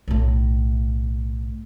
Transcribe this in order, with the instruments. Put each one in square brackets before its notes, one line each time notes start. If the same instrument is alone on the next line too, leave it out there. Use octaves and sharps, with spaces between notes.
[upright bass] B1 A2